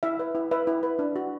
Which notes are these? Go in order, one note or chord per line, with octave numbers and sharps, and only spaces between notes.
E4 E5
B4
E4
B4 E5
E4
B4
D4
F#4